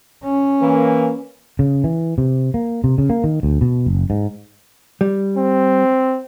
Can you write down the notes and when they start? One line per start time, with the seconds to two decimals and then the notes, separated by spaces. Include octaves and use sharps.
0.24 C#4
0.62 E3 A#3
1.59 C#3
1.84 E3
2.18 C3
2.54 A#3
2.84 C3
2.98 C#3
3.10 A#3
3.24 D#3
3.43 D2
3.61 B2
3.86 F#1
4.10 G#2
5.01 G3
5.37 C4